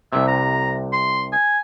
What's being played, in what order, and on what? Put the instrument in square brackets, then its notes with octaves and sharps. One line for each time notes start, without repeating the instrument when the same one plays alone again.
[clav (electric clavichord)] C2 C3 [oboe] E5
[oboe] A#5
C6
G#5